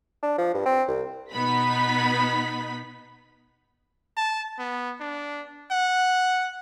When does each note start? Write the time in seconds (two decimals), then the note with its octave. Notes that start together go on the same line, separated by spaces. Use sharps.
0.23 D4
0.38 F3
0.54 G2
0.66 C4
0.88 C2
1.32 B2 B3 D#4 B5 B6
4.17 A5
4.59 B3
5.00 D4
5.71 F#5